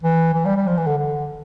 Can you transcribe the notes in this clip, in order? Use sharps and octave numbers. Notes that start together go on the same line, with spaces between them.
E3
E3
G3
G3
F3
E3
D3
D3